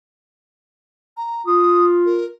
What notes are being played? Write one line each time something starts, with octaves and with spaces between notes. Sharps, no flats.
A#5
F4 D#6
A#4